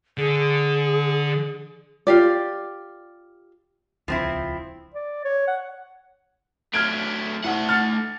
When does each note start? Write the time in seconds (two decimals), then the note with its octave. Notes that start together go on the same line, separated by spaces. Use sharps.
0.18 D3 G#4
2.07 F4 G4 D5
4.08 D#1 C#2 F3 C4 E4
4.94 D5
5.25 C#5
5.48 F#5
6.74 F#3 A3 F6 G#6 D7
7.44 C2 A3 F#5
7.69 F6 A6 C#7